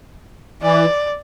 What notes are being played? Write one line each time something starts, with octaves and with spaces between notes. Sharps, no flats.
E3 D5